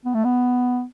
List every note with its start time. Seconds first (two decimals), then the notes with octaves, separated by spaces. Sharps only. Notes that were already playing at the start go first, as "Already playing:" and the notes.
0.05 B3
0.14 A3
0.24 B3